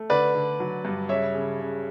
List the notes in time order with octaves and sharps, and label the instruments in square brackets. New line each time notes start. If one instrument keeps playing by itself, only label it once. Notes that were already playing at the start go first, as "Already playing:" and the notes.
Already playing: [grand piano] A3
D3 B4 D5
D3
F#3
G2
C#3 C#5 E5
C#3
C#3